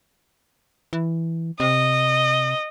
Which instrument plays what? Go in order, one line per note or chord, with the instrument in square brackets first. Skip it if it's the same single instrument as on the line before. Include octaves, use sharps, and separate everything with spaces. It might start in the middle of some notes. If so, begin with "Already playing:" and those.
[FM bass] E3
[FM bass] C3 [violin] D#5